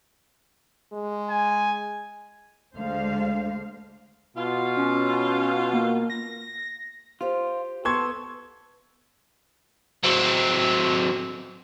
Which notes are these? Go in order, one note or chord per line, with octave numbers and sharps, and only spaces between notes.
G#3
G#5
D2 D3 G#3 C5 F5
B2 F4
C#4
A#3
A#6
F4 G4 C5
B3 A4 C6 C#6 G#6
F#3 C4